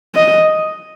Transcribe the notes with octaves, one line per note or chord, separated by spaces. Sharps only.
D#5